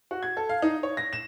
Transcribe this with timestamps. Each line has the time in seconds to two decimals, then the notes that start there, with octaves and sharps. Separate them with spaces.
0.11 F#4
0.23 G#6
0.37 A4
0.49 F5
0.62 D#4
0.83 C#5
0.97 A#6
1.13 E7